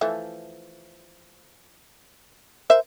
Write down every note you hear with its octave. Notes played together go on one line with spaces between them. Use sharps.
E3 F3 A3
A#4 C5 E5